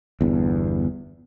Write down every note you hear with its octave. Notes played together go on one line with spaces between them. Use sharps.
G1 E2